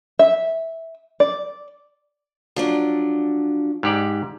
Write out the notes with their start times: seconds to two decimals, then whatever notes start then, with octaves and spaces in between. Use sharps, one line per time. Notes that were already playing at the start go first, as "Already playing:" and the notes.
0.19 E5
1.20 D5
2.56 F3 F#3 D4
3.83 G#2 G4 D5